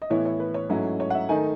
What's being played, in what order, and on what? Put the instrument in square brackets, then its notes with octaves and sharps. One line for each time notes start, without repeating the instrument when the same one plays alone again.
[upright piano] D#5
A2 E3 B3 E4 C#5
C#5
B4
C#5
G#2 F#3 A3 C#4 E4
C#5
F#5
E5
D#3 A3 D#4 G#5